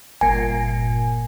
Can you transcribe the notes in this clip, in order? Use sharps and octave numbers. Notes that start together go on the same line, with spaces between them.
G1 A#2 G#5